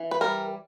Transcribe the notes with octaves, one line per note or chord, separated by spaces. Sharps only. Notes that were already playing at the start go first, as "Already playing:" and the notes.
Already playing: E3
B4
G3 A#4